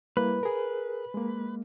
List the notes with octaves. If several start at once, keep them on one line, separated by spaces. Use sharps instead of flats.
G3 A#3 E4 B4
G#4 A#4
G#3 A#3